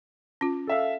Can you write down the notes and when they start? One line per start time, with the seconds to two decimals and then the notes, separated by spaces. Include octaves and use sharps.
0.41 C#4 F4
0.67 A4 E5 F5